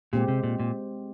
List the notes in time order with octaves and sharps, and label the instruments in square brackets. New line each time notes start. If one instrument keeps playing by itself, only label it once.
[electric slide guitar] A#2 [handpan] G#3 C4 G4
[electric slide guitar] C3
A#2
A#2